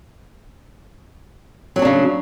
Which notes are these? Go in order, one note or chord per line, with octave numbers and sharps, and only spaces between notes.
C#3 F#3 D4 F#4